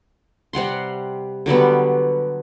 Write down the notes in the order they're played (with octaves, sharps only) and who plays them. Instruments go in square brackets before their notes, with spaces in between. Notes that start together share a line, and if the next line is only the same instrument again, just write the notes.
[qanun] C3 G3 F#5 C6
D3 F#3 G3 B3